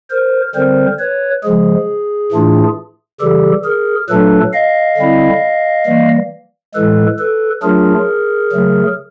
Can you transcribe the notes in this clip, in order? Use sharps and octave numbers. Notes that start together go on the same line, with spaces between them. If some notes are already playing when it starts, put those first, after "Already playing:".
A#4 C5
D3 G3 C4 A#4 C5
B4 C#5
C#3 F3 G#3 G#4
A2 E3 A3 D4 F4
C#3 E3 G3 G4 A4
G#4 A#4
A#2 F#3 A3 D4 A4 B4
D#5 F5
D3 G3 C4 E4
E3 G3 A#3
A2 E3 G#3 A4 B4
A4 B4
F#3 A3 D4 F4 G#4 A#4
C#3 F#3 A3